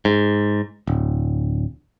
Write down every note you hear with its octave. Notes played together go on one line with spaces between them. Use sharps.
G#2
D1